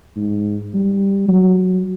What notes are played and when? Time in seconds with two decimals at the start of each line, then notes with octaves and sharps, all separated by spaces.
0.16 G#2
0.74 G3
1.28 F#3